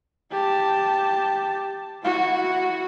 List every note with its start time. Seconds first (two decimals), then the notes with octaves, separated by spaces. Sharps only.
0.31 G4 A5
2.03 E4 F#4